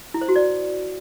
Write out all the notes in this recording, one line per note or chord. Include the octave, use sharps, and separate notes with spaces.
E4
C5
F#4
D5